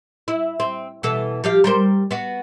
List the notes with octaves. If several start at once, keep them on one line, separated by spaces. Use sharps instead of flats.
E4
C4
B2 E3 A4
F3 G4 F5
G3 A#4 C5
B3 F#4